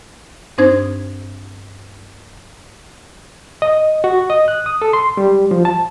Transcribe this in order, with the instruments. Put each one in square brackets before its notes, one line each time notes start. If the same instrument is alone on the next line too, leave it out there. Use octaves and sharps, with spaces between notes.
[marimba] G2 C4 D4 D#4 C5 G#6
[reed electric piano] D#5
F#4
D#5
F#6
D#6
A4
C6
G3
F3
A5